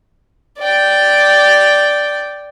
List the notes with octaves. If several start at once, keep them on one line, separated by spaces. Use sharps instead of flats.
D5 G5